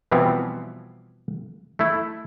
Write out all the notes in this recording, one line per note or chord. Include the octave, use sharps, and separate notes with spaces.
B2 E3 F3 G3 B3 C4
A3 E4